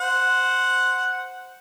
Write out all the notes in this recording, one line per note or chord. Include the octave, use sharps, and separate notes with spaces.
C5 F#5